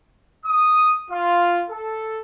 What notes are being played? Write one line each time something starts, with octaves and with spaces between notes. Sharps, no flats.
D#6
F4
A4